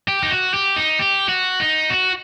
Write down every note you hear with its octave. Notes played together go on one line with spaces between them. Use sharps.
G4
D#4
F#4
G4
D#4
G4
F#4
D#4
F#4